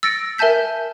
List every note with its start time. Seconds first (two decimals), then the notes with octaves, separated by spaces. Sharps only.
0.03 E6 A6 A#6 C#7 D7
0.38 A#4 E5 G#5 A5 G6 B6